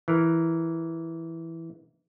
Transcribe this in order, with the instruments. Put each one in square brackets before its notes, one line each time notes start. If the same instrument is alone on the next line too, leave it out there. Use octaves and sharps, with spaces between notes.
[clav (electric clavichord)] E3 A#4